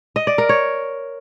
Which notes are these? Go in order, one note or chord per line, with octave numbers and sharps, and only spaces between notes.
D#5
D5
A#4
C#5